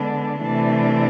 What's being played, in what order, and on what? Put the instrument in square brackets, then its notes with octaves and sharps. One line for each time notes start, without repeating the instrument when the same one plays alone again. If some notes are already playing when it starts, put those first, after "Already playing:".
Already playing: [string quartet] D3 G#3 B3 D4
C3 E3 A3 D4